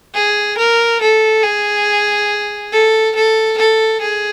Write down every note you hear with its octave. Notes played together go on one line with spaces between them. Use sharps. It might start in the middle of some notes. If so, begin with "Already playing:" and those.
G#4
A#4
A4
G#4
A4
A4
A4
G#4